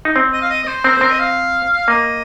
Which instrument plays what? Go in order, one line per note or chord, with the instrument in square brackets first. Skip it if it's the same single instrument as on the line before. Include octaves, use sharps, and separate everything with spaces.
[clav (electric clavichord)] D#4
C4
[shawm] D#5
F5
D#5
D#5
C5
[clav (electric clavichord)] C4 [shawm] A#4
[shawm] C5
[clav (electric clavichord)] C4 [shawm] A#4
[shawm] D#5
F5
[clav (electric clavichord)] A#3 [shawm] D#5